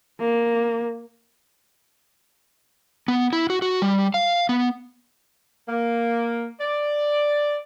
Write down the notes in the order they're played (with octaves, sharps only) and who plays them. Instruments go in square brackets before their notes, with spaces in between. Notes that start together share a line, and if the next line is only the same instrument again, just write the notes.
[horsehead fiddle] A#3
[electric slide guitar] B3
E4
F#4
F#4
G3
F5
B3
[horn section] A#3
D5